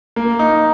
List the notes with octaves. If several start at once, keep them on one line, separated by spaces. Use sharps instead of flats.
A#3
D#4